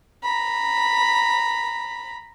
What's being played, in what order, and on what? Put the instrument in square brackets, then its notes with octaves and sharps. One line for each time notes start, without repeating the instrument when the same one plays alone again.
[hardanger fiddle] A#5 B5